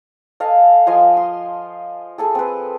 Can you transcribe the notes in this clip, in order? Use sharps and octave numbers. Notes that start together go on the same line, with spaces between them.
A4 D#5 F5 G#5
F3 D#5 G#5 C6
C6
G#4 A4 G#5
C4 B4